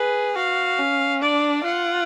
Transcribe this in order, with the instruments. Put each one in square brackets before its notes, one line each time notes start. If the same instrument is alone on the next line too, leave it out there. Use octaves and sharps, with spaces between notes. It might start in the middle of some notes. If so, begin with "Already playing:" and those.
Already playing: [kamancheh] G#4 [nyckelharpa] B4
[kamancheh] F#4 [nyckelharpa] F5
[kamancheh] C#4
[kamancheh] D4 [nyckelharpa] D5
[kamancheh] F4 [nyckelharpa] F#5